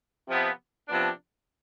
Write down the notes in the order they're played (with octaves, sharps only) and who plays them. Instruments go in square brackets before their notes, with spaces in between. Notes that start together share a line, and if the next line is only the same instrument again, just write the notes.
[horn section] C3 F3 B3
C3 F3 B3 D4